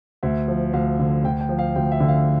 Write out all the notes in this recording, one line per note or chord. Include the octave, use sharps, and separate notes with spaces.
D2 E5
F3
D2 F5
D3
D2 G5
G5
F3
F5
D2 G5
E5
D3
F5